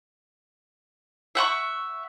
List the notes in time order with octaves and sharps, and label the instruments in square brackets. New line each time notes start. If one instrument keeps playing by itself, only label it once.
[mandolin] E5 F#5 B5 C#6